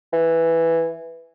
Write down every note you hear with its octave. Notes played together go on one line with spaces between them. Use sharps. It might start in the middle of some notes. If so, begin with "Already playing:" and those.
E3